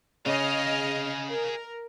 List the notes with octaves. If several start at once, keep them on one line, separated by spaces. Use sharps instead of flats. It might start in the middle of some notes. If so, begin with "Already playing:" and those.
C#3 G#4 D#5 F5 F6
A#4